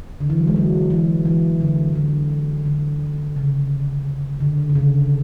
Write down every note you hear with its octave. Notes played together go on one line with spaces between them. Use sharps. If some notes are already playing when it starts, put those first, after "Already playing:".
D3
E3
F#3
G#3
F#3
E3
E3
D3
E3
D3
D3
C#3
D3
D3
C#3